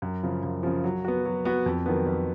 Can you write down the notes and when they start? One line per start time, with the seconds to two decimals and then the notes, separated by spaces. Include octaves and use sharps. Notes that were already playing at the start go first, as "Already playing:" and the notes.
0.02 F#2
0.23 C#3 F3
0.43 F#2
0.63 C#3 F3
0.84 F#3
1.05 B3 F#4
1.25 F#3
1.45 B3 F#4
1.66 F2
1.86 D#3 F#3 B3
2.06 F2